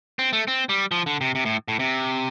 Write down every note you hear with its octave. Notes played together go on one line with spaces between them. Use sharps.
C4
A3
C4
G3
F3
D3
C3
C3
A2
A2
C3